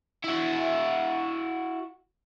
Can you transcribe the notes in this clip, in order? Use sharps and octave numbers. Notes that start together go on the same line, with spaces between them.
E4 F#4